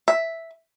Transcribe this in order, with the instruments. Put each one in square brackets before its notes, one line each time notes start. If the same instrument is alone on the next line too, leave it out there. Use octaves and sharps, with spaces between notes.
[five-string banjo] E5